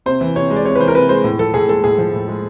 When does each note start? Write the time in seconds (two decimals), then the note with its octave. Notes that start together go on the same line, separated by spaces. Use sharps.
0.06 C3 C5
0.21 E3
0.36 C3 C#5
0.50 G#3
0.56 D5
0.65 C3 C#5
0.75 B4
0.80 E3 C5
0.88 A#4
0.95 C3 B4
1.09 G#3 C5
1.24 A2
1.39 F3 A4
1.54 A2 G#4
1.69 G#3 A4
1.84 A2 G#4
1.98 F3
2.13 A2
2.28 G#3